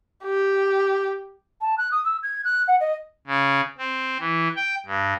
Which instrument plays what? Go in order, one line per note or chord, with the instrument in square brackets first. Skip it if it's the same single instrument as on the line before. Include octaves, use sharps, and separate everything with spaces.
[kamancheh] G4
[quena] A5
F#6
D#6
E6
G#6
F#6
F#5
D#5
[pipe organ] C#3
C4
E3
G5
G2